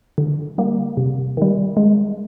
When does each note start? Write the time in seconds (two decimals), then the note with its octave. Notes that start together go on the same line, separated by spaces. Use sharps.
0.18 D3
0.58 G3 A#3
0.97 C3
1.37 D#3 G3
1.77 G#3